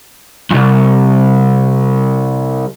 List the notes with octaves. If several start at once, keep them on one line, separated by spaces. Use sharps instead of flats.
C2 F2